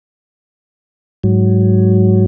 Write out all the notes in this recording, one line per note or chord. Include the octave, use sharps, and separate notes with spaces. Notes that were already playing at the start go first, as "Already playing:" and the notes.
G#2 F#3